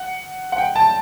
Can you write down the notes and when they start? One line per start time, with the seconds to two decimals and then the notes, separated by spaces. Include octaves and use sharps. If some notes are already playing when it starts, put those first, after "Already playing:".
Already playing: F#5
0.52 F#5
0.58 G5
0.76 A5